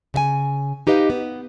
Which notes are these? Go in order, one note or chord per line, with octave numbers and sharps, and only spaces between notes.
C#3 E5 G#5
D#4 G4 B4 D#5 F5
B3